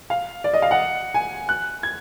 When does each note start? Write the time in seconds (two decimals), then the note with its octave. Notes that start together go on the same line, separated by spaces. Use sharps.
0.10 F5
0.44 D5
0.54 D#5
0.62 F5
0.71 F#5
1.14 G#5
1.49 F#6
1.83 G#6